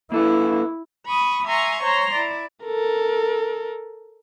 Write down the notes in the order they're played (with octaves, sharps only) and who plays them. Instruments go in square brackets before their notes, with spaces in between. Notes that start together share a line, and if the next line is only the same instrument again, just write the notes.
[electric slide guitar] A#3 A4 B4 [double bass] E4
[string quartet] B5 C#6 D#6
E5 G#5 A#5 C6 C#6
C5 C#5 A#5 C6
E4 D5
[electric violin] A4 A#4